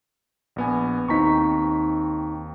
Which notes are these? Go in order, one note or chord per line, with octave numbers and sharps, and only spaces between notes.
A#1 B3 G#5
D#2 C4 D#4 A#5 C#6 B6